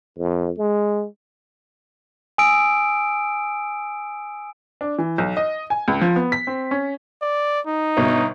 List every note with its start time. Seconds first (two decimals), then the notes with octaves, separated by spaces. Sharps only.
0.18 F2
0.58 G#3
2.38 G#5 D#6 E6 D7
4.81 D4
4.99 E3
5.18 B1
5.37 D#5
5.70 G#5
5.88 C#2
6.01 F3
6.16 B3
6.32 B6
6.47 C4
6.71 C#4
7.22 D5
7.67 D#4
7.97 G1 B2